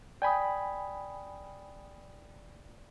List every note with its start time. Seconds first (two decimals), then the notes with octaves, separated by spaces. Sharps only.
0.22 D5 G5 G#5 B5 D#6